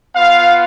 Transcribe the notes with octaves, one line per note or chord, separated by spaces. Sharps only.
B3 F4 F5